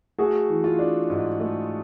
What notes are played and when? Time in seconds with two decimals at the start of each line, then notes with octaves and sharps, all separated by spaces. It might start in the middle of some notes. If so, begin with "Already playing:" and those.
0.19 A3 F#4 G#4
0.49 E3
0.64 F4
0.79 D4
1.10 G#2
1.40 A3